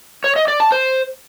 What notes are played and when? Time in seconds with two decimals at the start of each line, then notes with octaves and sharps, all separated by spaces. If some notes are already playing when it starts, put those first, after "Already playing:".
0.24 C#5
0.36 D#5
0.48 D5
0.60 A5
0.72 C5